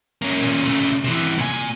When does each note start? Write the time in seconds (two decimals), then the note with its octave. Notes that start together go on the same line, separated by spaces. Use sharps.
0.22 A#3 C#4
0.42 A#2 C#4
0.65 C#3 A3
1.04 C3 E3
1.38 A#2 G#5